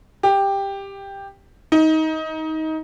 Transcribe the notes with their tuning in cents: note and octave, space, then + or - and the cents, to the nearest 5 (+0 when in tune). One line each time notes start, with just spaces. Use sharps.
G4 +10
D#4 +20